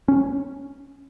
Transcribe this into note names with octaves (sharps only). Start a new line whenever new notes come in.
C#4